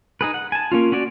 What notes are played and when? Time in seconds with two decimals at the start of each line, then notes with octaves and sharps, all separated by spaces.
0.21 D#4 G#4 B4
0.34 F#5
0.52 G#5 A5
0.72 A#3 C#4 F4
0.92 C#4 F#4 D5